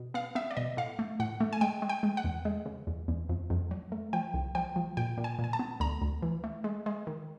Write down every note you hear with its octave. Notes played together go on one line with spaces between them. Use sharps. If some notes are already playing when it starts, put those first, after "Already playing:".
Already playing: B2
B3 F5
B3 E5
D5
B2 D#5
A2 F5
A3
A2 F#5
A3
G#5
G#3 G5
G#3
G5
G#3
F#5
E2
G#3
C#3
E2
E2
F2
F2
F#3
A3
F3 G5
C2
F3 G5
F3
A#2 G5
A#2
G#5
A#2
G#5
A5
B3
D2 A#5
D2
E3
A3
G#3
G#3
D#3